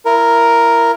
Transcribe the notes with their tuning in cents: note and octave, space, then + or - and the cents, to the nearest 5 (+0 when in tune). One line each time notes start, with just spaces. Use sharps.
E4 +25 A#4 +0